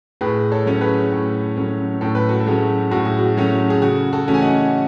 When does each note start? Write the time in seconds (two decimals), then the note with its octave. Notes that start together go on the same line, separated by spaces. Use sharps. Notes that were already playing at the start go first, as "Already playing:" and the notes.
0.21 A2 G#4 B4
0.52 A4 C#5
0.66 F#3 A3 C#4 C#5
0.81 G#4 B4
1.12 A2
1.57 F#3 A3 C#4
2.01 A2 A4
2.15 B4
2.29 F#4 A4
2.40 A4
2.47 F#3 A3 C#4 G#4
2.91 A2 F#4
3.05 G#4
3.18 F#4
3.37 F#3 A3 C#4
3.70 G#4
3.82 C#3 F#4
4.13 F#4 A4
4.28 E3 A3 C#4
4.34 G#5
4.42 D#5 F#5